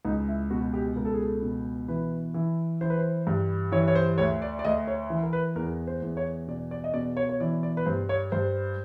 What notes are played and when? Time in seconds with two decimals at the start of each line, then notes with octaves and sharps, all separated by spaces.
0.05 C#2 D#4
0.28 E4
0.50 B2 F#4
0.73 G4
0.96 C#2 A#4
1.05 A4
1.13 G#4
1.22 A4
1.42 B2
1.88 E3 B4
2.34 E3
2.81 E3 C5
2.90 B4
2.98 C5
3.27 G2
3.72 E3 C#5
3.88 C#5
3.95 C5
4.18 D2 C#5
4.42 D5
4.59 D5
4.64 D2 D#5
4.88 C#5
5.10 E3
5.23 A#4
5.33 B4
5.56 E2 A#4
5.87 C5
6.02 E2
6.17 C#5
6.47 B2 D5
6.71 D5
6.84 D#5
6.93 B2 D5
7.17 C#5
7.29 C#5
7.40 E3 D5
7.63 D5
7.77 B4
7.86 G2 C5
8.09 C#5
8.32 G2 C5